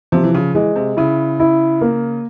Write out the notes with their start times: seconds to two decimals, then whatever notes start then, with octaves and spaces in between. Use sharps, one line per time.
0.12 C3 F3
0.24 E3
0.34 C#3
0.55 E3 G#3
0.76 C3
0.97 C#3 E4
1.39 E4
1.81 A#3